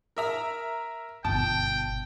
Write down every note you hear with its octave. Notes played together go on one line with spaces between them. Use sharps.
A#4 E5 A#5
G1 B2 G5 A5